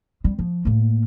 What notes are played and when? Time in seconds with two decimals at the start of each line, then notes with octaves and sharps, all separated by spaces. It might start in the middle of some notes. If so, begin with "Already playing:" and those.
0.24 G3 C4
0.39 F3
0.65 A2 A#3